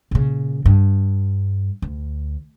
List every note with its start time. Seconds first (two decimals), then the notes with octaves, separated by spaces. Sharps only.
0.11 A#2 C#3
0.65 G2
1.82 D2